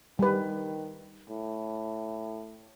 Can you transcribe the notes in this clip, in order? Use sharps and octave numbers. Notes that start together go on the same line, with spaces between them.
D#3 G3 B4
A2